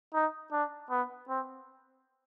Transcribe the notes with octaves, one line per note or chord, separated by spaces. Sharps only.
D#4
D4
B3
C4